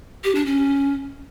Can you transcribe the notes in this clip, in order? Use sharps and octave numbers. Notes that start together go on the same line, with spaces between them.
G4
D4
C#4